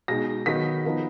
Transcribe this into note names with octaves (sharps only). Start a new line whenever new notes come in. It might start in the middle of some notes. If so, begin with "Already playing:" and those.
B2 G#3 D#4 A#6
D#3 F#3 B3 D#4 B6
F3 B3 D#4